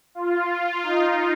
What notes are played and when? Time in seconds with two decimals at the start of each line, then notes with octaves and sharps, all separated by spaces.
0.15 F4
0.83 D#4